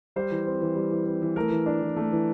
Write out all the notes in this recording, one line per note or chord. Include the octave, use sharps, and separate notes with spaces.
G3 C5
E3
C4
E3
G3
E3
C4
E3
A3 A#4
E3
D4
E3
A3
E3